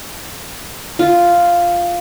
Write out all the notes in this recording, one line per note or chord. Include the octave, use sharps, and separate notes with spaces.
F4